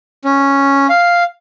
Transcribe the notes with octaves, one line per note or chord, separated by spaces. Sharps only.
C#4
F5